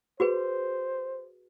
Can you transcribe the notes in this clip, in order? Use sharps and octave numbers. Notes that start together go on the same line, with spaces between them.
F#4 G#4 B4 C5